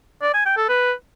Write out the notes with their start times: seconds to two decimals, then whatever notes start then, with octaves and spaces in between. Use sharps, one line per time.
0.22 D5
0.34 G#5
0.46 G5
0.57 A4
0.69 B4